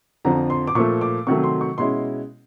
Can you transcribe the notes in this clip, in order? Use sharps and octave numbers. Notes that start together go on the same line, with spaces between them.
F2 D3 F3 A#5
C6
D6
A#2 F3 A3 C#6
D6
C3 D#3 F#3 A3 C#6
C6
C#6
B2 G#3 C#4 E4 C6